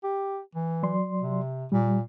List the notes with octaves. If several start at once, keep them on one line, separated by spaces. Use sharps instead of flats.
G4
E3
F#3 D5 C6
C3
A#2 G3